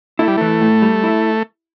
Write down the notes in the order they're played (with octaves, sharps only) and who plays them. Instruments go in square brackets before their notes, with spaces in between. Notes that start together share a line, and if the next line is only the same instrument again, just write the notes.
[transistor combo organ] A3 [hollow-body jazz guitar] E4
[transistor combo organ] G3
[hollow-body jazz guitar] E3 [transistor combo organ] A3
[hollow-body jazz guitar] A2
G3
E4